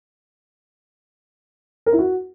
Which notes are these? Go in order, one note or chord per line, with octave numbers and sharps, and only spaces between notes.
A#4
E4
F#4